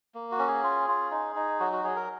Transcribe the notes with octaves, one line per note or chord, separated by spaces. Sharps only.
A#3
F#4
C#4
G#4
F4
F4
D#4
D#4
F#3 F#4
F#4
F#3 G#4
A#4